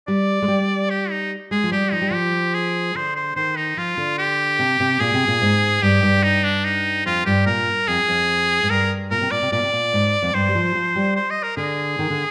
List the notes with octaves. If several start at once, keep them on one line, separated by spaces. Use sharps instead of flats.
G3 D5
G#3
G3
G4
D#4
G#3 G#4
F3
G3 G4
F3 D#4
G3
F3 G4
G#4
D3 C5
C5
D#3 C5
D#4
F3 F4
D3
G4
C3
C3
A#2 G#4
C3
A#2
G#2
G2 G4
G2
D#4
D4
D#4
F2 F4
G2 G4
A#2 A#4
F2 G#4
F2
G#2
G2 A#4
A#2 A#4
C3
A#2 D5
C3
A#2 D5
C3
A#2
G#2
F2
G2 C5
G3
F3
F3
G3
C5
D#5
A#4
D3 G#4
D#3
D3